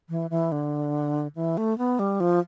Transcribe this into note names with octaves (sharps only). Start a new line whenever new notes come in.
E3
E3
D3
E3
A3
B3
G3
F3